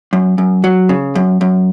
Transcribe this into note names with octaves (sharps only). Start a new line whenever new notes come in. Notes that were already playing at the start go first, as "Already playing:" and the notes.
F#2
F#2
F#3
C#3
F#2
F#2